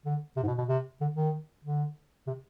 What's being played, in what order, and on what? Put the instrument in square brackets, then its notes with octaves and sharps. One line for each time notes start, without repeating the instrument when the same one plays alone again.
[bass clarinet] D3
C3
G#2
B2
B2
C3
D3
D#3
D3
C3